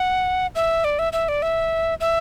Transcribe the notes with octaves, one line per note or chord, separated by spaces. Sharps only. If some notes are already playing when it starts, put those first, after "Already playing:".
Already playing: F#5
E5
D5
E5
E5
D5
E5
E5